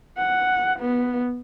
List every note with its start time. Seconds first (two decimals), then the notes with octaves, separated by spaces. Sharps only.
0.18 F#5
0.79 B3